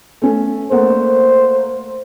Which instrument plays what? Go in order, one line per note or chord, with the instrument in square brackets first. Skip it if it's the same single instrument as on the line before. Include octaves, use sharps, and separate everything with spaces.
[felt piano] A3 C#4 A4
[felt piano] A3 A#3 F#5 [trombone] C5